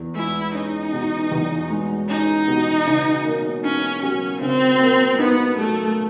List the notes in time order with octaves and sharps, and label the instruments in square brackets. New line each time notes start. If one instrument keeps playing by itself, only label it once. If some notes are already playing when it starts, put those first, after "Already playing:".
Already playing: [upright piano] E2
[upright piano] G#3 [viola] E4
[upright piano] C#4 [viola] D#4
[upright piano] B2
E2
G#3
[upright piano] C#4 [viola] D#4
[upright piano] B2
C#3
A#3
[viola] C#4 [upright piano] D#4
[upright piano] F#3 [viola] C#4
[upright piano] C#3 [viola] C4
[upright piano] A#3
[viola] B3 [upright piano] D#4
[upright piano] F#3 [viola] A3